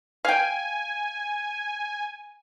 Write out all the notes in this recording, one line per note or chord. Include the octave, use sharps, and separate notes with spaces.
F5 G5 G#5